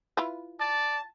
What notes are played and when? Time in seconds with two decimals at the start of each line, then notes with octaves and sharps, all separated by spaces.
0.17 E4 F4 B4
0.60 D5 A5